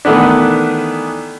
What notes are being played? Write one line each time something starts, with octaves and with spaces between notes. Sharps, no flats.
D#3 E3 A3 B3 D4